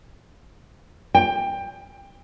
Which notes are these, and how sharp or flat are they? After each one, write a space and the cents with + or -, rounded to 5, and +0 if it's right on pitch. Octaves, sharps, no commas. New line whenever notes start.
G5 +20